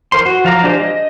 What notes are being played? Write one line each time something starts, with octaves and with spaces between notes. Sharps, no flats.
E3 A#4 C5 C6
F#4
F3 F5 A#5 D6
G#3 D4 G4 C5
D#5